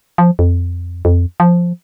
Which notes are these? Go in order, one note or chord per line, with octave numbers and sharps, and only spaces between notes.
F3
F2
F2
F3